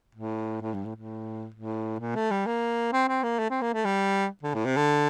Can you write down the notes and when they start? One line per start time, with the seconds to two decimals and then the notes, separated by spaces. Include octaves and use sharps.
0.15 A2
0.61 A2
0.74 G2
0.85 A2
0.96 A2
1.54 A2
2.00 A#2
2.15 A3
2.31 G3
2.46 A#3
2.92 C4
3.08 C4
3.23 A#3
3.39 A3
3.50 C4
3.61 A#3
3.73 A3
3.85 G3
4.43 D3
4.54 A2
4.65 C3
4.76 D3